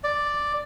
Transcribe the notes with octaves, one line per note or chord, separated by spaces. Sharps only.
D5